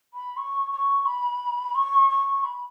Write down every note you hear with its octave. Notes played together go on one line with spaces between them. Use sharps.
B5
C#6
C#6
B5
C#6
C#6
B5